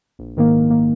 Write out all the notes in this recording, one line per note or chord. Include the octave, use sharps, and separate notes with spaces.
A#1
G#2 D#3 A#3
A#1
D#3 A#3